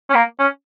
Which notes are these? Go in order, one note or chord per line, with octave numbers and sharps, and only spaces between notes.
C#4
A#3
C#4